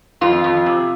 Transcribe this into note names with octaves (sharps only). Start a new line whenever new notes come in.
F2 F4
F2
C3